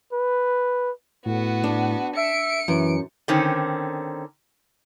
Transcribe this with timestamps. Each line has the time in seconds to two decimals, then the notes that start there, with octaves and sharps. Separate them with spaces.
0.13 B4
1.25 A2 B3 F#4
1.64 D4
2.17 E5 C#7 D7
2.68 F#2 E3
3.28 D3 D#3 C4 C#4